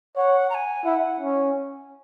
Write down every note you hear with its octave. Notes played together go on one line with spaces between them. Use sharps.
C#5 F#5
A#5
G#5
E4 F#5
C#4